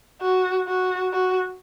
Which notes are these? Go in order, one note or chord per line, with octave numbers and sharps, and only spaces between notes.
F#4
F#4
F#4